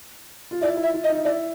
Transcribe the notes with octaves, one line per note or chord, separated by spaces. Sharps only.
F4
E4 D5
E4
E5
E4
D#5
D#4
E4 D5